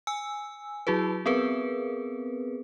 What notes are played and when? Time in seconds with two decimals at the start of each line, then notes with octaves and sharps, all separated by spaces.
0.07 G#5 E6
0.87 F#3 E4 F#4 G#4 B4
1.26 B3 C4 G#4 A#4 B4